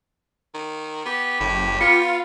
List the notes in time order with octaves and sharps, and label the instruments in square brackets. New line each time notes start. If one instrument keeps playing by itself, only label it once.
[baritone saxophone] D#3
[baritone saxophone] B3 [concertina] G4
[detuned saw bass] F#1 [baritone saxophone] A2
[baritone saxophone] B3 [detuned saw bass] F4 [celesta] C#7